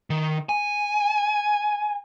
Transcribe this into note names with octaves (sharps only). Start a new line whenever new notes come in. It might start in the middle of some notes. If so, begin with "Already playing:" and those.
D#3
G#5